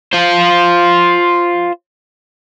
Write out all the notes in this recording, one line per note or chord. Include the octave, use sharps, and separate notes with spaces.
F4 C5